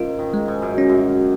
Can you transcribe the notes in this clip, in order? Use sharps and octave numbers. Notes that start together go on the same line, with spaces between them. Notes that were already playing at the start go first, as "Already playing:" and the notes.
Already playing: G#2 C#4 F4 A#4
D#3
G#3
G#2
F#2
C#4
F#2